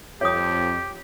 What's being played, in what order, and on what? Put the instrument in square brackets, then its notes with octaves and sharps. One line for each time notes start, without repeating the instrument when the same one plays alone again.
[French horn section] F2 [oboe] G4 [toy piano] C#5 D#6